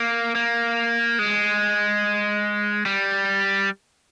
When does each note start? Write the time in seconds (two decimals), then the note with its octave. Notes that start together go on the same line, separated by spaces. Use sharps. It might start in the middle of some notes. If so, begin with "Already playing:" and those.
Already playing: A#3
0.35 A#3
1.19 G#3
2.86 G3